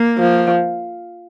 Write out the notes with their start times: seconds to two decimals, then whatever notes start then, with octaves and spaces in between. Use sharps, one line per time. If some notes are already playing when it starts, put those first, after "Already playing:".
Already playing: A#3
0.19 F3